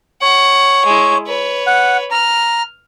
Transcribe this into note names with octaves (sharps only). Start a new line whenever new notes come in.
C#5 F#5
G#3 E4
B4 C#5
F#5
A#5 F6